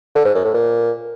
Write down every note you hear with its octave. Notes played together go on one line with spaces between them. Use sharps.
D3
G#2
F#2
A2
A#2